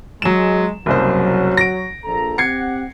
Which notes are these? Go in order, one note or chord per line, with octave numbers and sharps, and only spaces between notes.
F#3 G#3 E7
F#1 C2 F#3 C5
A#6 D7
A#1 A4 A#5
C4 G4 F#5 G#6 C7 C#7